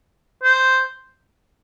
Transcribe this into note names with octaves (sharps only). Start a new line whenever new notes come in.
C5